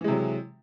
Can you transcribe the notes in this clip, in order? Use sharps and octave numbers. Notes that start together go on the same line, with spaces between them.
C3 E3 F#3 G#3